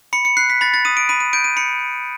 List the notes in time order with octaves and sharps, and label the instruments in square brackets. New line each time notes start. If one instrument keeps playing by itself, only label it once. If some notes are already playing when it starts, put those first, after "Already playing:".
[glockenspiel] B5 C#7
C#7
F#6 C7
B6
B5 A6
A6
D#6 D#7
D7
B5 D#7
D#7
G6 D7
D#7
B5 C#7